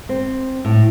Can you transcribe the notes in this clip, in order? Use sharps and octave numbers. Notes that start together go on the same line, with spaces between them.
C4
A2